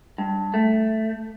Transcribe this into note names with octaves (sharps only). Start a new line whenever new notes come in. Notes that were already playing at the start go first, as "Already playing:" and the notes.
G2
A3